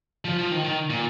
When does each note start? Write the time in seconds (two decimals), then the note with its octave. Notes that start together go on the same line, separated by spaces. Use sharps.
0.25 F3
0.38 F3
0.52 D#3
0.64 D#3
0.90 A#2